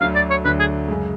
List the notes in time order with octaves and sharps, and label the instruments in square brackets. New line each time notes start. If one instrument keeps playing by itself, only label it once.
[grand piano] D2 D3 F#3 [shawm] F5
[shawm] D5
C#5
[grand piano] D2 D3 F#3 [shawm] B4
[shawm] G#4
[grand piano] F#2 C#3 G#3